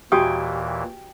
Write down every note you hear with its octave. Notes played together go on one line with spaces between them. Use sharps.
D#2 A#2 E3 F#4 G4 G5 G#5 D#6